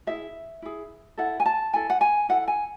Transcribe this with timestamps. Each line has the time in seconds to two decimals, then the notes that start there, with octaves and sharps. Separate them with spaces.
0.07 E4 G#4 E5
0.62 E4 G#4
1.18 E4 A4 F#5
1.40 G#5
1.46 A5
1.73 E4 A4 G#5
1.90 F#5
2.01 G#5
2.29 E4 A4 F#5
2.48 G#5